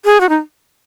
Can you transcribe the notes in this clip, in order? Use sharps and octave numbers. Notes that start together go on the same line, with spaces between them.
G#4
F#4
D#4